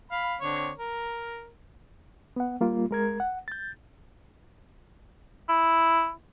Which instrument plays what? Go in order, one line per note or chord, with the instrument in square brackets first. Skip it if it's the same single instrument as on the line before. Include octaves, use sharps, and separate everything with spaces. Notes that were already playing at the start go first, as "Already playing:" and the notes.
[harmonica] F5 B5
D3 C4 C#5
A#4
[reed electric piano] B3 F#5
G3 A#3 F4
G#3 A#4 G#6
F#5
G6 A6
[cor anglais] E4